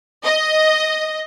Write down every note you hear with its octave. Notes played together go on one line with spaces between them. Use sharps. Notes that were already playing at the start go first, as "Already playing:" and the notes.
D#5